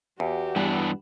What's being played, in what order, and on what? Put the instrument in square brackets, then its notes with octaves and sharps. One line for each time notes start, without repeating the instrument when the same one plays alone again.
[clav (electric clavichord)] E2 [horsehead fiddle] F#4 G4
[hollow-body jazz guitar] G2 [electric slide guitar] E3 B3 D4